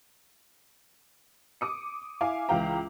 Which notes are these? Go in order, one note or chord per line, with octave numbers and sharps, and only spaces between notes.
D6 D#6 C#7
E4 E5 F5 G#5 D6
C#2 E3 E4 F5 G5 A#5